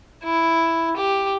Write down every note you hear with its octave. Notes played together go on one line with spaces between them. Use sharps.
E4
G4